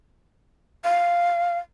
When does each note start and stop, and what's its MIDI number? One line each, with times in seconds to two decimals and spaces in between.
0.84 1.58 77